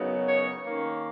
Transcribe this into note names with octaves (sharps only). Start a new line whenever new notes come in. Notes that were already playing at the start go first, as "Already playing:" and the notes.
Already playing: F#2 C#3 F#3 B3 D#4
C#5
D#3 A#3 C#4